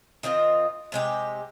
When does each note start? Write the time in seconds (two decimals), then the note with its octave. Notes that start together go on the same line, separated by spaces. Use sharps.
0.23 D#3 C4 F4 D#5
0.92 C3 G#3 G4